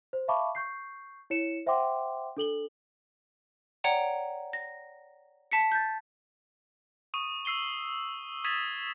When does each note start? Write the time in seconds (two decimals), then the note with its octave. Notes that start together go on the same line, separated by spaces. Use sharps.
0.13 C5
0.28 E5 F5 A5 B5 C#6 D6
0.55 C#6 G6 C7
1.30 E4 C#5 C#7 E7
1.66 C5 E5 F#5 G5 C6 D6
2.37 D4 A4 F#7 G7
3.84 C#5 D5 F#5 G5 A#5
4.53 A#6
5.52 A5 B6 C#7
5.72 G6 A6
7.14 C#6 D#6 D#7
7.45 E6 C7 D#7 G7
8.44 D#6 G#6 A6 B6 D#7 E7